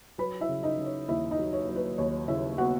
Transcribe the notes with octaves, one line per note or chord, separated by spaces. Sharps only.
F#3 B4 B5
E4 E5
C#3
D#4 D#5
C#3
C#5
D#2 E4 E5
D#4 D#5
F#3
C#5
F#3
B4
D#2 C#5
C#3 E4 E5
B3 F#4 F#5